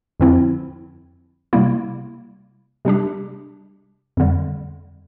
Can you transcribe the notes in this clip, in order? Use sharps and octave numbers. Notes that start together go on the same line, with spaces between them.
F2 D3 F3 C4 E4
C3 G3 A#3 E4
C3 G3 D4 G4
F2 D3 G3